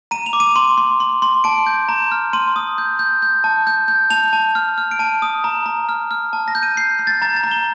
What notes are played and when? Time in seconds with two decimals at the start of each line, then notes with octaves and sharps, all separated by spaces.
0.11 A#5 D#7
0.26 F7
0.33 D6
0.40 D#7
0.56 C6 D#7
0.77 C6
1.00 C6
1.22 C6
1.44 A5 D7
1.67 G6
1.89 A#5
2.12 F6
2.33 C6 D#7
2.56 D#6
2.78 G6
2.99 G6
3.22 G6
3.44 A5
3.67 G6
3.88 G6
4.10 A5 F7
4.33 A5
4.55 F6
4.78 F6
4.91 D7
4.99 A5 D#7
5.22 D#6
5.44 A#5
5.66 A#5
5.89 F6
6.11 F6
6.33 A5
6.48 A#6
6.55 G6
6.63 D#7
6.77 G6 C7
6.99 G6
7.07 A6
7.22 A#5 A6
7.36 A6
7.44 A#5
7.51 G7